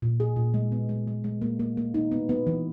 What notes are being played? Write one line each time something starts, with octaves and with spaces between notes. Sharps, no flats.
A#2
G#4
A#2
G#3
B3
G#3
G#3
G#3
A#3
A#3
A#3
D#4
B3
B3
E3